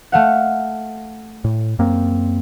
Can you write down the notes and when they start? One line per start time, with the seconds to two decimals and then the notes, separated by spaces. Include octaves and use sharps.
0.12 A3 F5 F#5
1.44 A2
1.79 F#2 A#3 C4